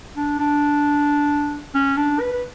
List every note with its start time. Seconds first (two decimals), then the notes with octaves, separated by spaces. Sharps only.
0.16 D4
0.39 D4
1.75 C#4
1.97 D4
2.20 B4
2.32 B4